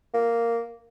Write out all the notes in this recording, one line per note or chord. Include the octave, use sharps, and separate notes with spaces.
A#3